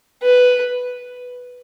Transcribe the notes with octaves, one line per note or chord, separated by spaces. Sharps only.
B4